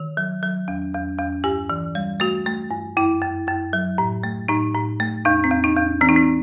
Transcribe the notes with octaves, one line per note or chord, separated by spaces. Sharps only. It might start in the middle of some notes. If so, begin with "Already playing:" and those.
Already playing: D#3
F#3
F#3
E2
E2
E2
G2 G4
E3
G3
A3 F#4
A3
G2
F#2 E4
F#2
F#2
F#3
A2
A3
A2 D#4
A2
A3
E2 D#4
C4
E2
D#4
E2
E3 C4
D#4
C4